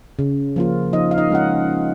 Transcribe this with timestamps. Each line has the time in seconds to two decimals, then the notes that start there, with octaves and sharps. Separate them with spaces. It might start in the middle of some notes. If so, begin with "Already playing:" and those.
0.19 C#3
0.56 F3 A#3 F4
0.93 F3 D#4 D#5
1.11 F5
1.18 D#4 D#5
1.30 G#3 C#4 F4 F#5